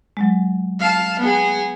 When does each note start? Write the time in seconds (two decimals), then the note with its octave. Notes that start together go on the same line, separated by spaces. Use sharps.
0.17 F#3 G#3
0.80 F5 A5
1.19 B3 G#4